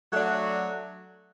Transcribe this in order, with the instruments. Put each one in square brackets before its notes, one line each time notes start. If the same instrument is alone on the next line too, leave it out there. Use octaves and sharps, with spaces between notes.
[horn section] F#3 A3 D4 F#4